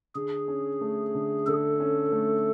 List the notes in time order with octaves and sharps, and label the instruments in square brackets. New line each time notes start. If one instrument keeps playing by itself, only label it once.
[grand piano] D3 [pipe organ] G#4
[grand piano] C#4
A3
D3
[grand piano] D3 [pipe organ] A4
[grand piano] C#4
A3